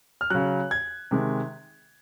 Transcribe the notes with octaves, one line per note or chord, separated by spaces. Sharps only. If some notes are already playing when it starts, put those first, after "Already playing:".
F6
C#3 F#3 F#6
G#6
C3 D#3 G#3